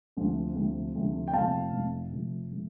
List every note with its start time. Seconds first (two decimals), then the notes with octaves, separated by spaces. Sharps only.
0.17 D2 C3 F3 A3 C4
0.55 D2 C3 F3 A3 C4
0.94 D2 C3 F3 A3 C4
1.28 G5
1.33 F1 F2 F3 A3 F5 A5
1.72 F1 F2 F3 A3
2.12 F1 F2 F3 A3
2.51 F3 A3